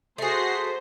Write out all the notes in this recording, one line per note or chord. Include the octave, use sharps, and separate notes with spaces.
A3 F#4 G#4 C5 A#6 C7